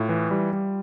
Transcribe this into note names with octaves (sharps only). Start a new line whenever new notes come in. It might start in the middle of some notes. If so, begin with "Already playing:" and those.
Already playing: A2 F4
E3
G3
G3